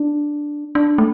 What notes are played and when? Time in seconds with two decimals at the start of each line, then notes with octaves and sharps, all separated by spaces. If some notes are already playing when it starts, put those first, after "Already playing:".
Already playing: D4
0.75 D4
0.98 A3